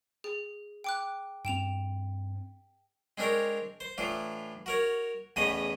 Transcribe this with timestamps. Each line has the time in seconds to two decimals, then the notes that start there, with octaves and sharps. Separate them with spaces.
0.24 G#4
0.84 G5 D6 F#6
1.45 G2 C4 G5 E7 F7
3.18 G#3 C4 D4 A#4 C#5
3.80 C5
3.98 A2 E3 D4 F4
4.66 F#4 A#4 C#5
5.36 E2 A2 C#3 B4 D#5 D#6